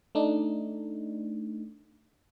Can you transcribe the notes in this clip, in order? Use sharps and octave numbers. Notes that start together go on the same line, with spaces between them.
A3 D4 D#4